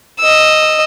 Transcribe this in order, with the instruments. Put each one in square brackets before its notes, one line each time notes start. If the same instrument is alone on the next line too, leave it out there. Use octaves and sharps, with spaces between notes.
[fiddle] D#5 E6